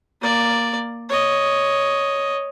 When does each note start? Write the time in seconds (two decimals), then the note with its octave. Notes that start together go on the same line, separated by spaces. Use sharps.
0.21 A#3 D5
1.09 C#5 D#5